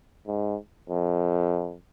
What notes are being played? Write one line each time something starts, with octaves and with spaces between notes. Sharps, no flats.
G#2
F2